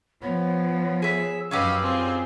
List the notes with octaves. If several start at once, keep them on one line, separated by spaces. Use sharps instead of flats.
F3 B3 C#5
G#4 E5
F#2 F#3 C#4 D#4 G4 B4 F5 E6
C4 F4 G#4 G#5